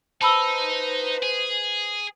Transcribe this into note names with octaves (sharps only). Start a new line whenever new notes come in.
D#4 B4 C5 A5 B5 E6
G#4